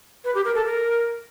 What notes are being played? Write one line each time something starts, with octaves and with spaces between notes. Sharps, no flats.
B4
G4
A#4
A4
A#4